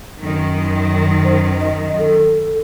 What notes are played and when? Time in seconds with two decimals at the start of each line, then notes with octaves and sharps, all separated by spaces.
0.19 F#2 D#3
1.24 C5
1.61 D#5
1.98 A4